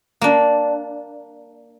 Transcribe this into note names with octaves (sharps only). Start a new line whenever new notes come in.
A#3 D4